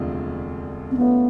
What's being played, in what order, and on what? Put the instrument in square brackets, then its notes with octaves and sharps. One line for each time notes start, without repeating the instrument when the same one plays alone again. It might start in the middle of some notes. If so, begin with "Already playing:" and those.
Already playing: [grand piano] E1 D2 C3 F3
[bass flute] C4
[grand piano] D2 D3 F3 A3 C#4 [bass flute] B3